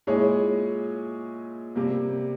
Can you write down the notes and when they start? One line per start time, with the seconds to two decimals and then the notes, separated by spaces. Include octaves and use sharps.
0.07 A#2 G#3 E4 G#4 C#5
1.75 C3 G3 A#3